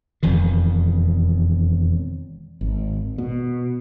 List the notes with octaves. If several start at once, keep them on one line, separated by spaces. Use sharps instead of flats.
E1 F2 D#3
G#1
B2